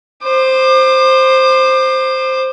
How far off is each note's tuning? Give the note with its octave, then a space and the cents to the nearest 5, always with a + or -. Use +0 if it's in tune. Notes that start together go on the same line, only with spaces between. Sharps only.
C5 +0 D6 +35